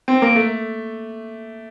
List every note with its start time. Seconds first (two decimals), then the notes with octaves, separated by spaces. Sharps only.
0.08 C4
0.22 A#3
0.36 A3